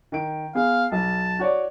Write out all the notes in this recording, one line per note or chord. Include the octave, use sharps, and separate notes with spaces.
D#3 D7
B3 G#4 F5
B1 A5
F#4 C#5 D5